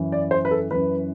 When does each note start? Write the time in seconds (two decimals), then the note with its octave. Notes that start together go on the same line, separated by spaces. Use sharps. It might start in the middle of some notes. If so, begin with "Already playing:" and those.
Already playing: F#2 E3
0.12 D5
0.31 C5
0.45 B4
0.51 A4
0.71 F#2 E3 B4